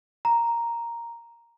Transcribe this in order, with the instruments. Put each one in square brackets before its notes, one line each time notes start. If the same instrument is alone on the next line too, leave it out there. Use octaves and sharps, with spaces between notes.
[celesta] A#5